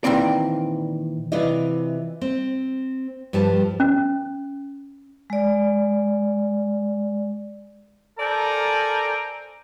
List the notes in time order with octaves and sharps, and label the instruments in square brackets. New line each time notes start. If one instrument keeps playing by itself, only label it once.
[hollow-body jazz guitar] A#2 D#3 E3 C4 D5
[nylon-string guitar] C3 E3 E4 F4 D5 D#5
C4
G2 F3 G4 A5
[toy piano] C#4
[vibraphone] G#3 D5
[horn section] A4 A#4 C5 D5 G#5 A#5